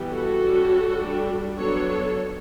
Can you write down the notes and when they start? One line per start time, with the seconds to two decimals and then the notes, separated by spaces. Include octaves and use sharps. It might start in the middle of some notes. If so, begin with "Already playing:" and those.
Already playing: E3 G3 B3
0.10 F#4 A4
0.40 G3 C#4
0.99 G3 D4
1.57 F#3 B3 D4 A4 C#5
1.87 A4 C#5